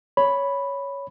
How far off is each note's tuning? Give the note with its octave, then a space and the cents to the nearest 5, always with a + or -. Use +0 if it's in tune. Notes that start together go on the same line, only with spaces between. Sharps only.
C#5 +10 B5 +0